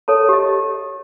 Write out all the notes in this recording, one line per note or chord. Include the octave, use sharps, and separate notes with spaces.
A4 C#5 A5
G4 D#5